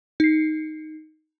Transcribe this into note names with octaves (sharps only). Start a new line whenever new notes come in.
D#4 C7